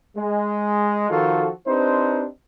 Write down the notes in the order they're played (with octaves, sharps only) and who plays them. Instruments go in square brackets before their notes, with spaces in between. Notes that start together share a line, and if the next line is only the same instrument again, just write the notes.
[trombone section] G#3
D#3 F3 F4 F#4 A4
C4 D4 D#4 G4 B4 C5